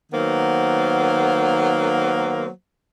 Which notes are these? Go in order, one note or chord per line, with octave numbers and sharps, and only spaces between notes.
D#3 F#3 A#3 B3 C5